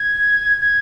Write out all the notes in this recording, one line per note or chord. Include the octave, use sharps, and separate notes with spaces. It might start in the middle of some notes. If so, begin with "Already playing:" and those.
Already playing: G#6
G#6